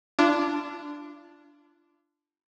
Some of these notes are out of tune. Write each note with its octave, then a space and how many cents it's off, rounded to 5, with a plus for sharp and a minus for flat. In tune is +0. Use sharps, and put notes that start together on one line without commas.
D4 +0 F4 -35